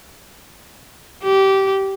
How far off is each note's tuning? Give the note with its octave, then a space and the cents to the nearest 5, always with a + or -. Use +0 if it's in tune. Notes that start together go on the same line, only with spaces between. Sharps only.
G4 -20